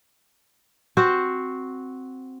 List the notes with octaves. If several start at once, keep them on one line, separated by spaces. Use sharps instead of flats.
C4 F#4 C5